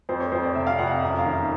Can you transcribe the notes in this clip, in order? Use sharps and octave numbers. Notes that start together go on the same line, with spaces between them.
F2 C5
C#5
F2 C5
D5
C3 E5
F5
F2 F#5
F5
F#2 E5
F5
D#3
F5